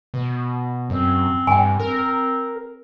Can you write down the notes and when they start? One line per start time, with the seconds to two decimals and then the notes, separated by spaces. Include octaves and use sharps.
0.14 B2
0.90 F#2 C4
1.47 G2 G5 G#5
1.80 C4 A#4